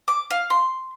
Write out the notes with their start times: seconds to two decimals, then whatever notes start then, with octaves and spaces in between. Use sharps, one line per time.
0.08 D6
0.30 F5
0.50 C6